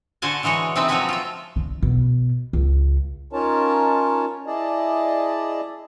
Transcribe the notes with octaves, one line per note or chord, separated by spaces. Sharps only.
D3 F#4 C5 G#5 A5
D3 E3 G#3 F#4 C#5
C3 C4 D#4 B4 E5
F3 F#3 A3 F#4 E5 G#5
F4 E5
D3
B2
C#2
C#4 D#4 F4 A#4 C#5 A5
E4 G#4 D5 D#5 A5